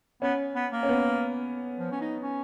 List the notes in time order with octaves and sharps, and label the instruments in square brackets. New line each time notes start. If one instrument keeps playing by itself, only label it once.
[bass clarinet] B3 [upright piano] C#4
[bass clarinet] B3
A#3
[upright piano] C#4
B3
[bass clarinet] F3
C#4
D#4
C#4